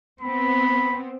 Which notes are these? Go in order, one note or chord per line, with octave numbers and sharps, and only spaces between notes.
B3 C4 B5